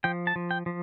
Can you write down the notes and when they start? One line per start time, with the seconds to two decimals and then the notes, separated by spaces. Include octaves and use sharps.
0.04 F3 G5
0.27 A5
0.36 F3
0.51 G5
0.66 F3